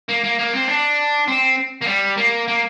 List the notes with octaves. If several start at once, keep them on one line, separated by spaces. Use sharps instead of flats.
A#3
A#3
A#3
C4
D4
C4
A#3
G3
A#3
A#3